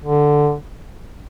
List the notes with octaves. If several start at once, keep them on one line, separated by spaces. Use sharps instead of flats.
D3